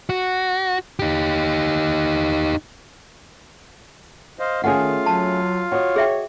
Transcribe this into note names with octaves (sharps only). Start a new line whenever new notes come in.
F#4
D#4 G4
C5 D#5 F5
D#3 A3 C#4 F4 G#4 F5 F#5
F#3 A5
F#4 C#5 D#5
G#4 E5 G5